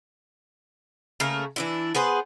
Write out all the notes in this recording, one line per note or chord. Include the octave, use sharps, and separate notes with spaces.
C#3 A3 A#3 A#4
E3 D4 E4
B3 G#4 B4 C5